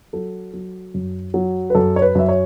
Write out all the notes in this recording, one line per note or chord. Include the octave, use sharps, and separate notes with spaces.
F#3 A4
F#3
F#2
F#3
B4
F#2 A4
C#5
B4
F#2 E5
C#5